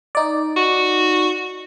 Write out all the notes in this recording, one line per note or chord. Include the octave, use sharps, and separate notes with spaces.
D#4 D5
F#4